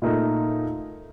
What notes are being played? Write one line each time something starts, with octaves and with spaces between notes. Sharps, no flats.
A#2 A3 D#4 A#4